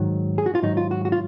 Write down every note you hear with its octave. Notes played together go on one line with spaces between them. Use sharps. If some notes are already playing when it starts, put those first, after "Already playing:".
Already playing: G#2 D#3 F#3
G#4
F#4
F4
G#2 D#3 F#3 D#4
F4
F#4
F#4
F4